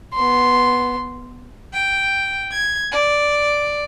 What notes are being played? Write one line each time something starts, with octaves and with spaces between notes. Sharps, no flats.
B3 C6
G5
G#6
D5